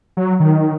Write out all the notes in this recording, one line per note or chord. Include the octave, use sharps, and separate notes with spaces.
F#3
D#3